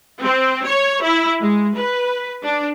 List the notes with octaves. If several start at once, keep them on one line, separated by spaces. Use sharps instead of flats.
C4
C#5
E4
G#3
B4
D4